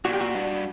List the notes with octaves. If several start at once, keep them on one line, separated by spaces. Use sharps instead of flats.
A#2 F#4
G4
F#4
G2